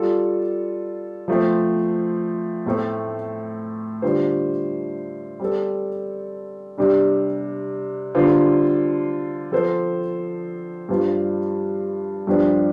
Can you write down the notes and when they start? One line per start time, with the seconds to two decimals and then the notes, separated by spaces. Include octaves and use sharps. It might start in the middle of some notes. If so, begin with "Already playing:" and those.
Already playing: G3 F4 A4
1.28 F3 A3 C4
2.66 A2 A3 C4 A4
4.02 D3 G3 F4 C5
5.40 G3 C4 A4
6.78 C3 G3 D4
8.15 D3 G3 F4 C5
9.52 F3 C4 A4 C5
10.89 G2 G3 F4 C5
12.27 G2 F3 D4 G4 C5